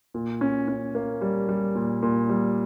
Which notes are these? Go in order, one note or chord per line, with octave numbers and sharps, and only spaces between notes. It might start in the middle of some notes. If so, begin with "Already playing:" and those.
A#2
C#4
C#4
A#3
G3
G3
A#2
A#2
G3